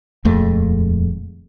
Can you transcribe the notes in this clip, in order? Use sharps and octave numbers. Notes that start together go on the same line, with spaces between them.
D#1 F2 G#3 A3